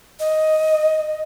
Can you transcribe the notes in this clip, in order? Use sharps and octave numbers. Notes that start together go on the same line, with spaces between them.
D#5